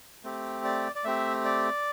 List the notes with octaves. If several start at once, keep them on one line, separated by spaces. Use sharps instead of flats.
A3 C4 G4
D5
D5
A3 C4 G4 E5
D5